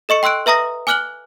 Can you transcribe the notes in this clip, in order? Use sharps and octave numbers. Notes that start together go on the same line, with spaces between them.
A4 D#5 C#6 C#7
G5 C6 E6 F#6 D7
B4 E5 A#5 D#6 A#6
G#5 D6 F6 F#6 F#7 G7